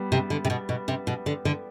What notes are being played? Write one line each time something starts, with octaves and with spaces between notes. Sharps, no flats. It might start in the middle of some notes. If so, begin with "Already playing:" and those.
Already playing: G3 B3
C3
D3
C3
B2
B2
C3
B2
D3
D3